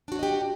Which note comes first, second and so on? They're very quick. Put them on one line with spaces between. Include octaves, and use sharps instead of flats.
D4 F#4 C#5 D#5 G4